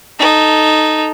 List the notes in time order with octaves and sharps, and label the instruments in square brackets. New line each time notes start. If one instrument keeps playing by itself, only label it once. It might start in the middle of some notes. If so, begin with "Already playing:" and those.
[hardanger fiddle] D#4 A4